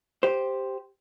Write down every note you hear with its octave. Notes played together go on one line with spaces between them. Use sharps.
G4 C5